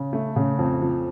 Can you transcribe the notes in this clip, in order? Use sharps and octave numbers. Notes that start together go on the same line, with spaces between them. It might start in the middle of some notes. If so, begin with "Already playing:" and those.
Already playing: C#3
A3
C#3
F2
F3